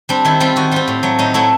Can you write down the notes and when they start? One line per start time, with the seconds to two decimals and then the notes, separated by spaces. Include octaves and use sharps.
0.09 G3 C4 D4
0.25 D#3 E4
0.40 G3 C4 F4
0.56 D#3 F#4
0.71 G3 C4 F4
0.88 A2
1.03 F#3 A3
1.19 A2 D#4
1.34 F#3 A3 E4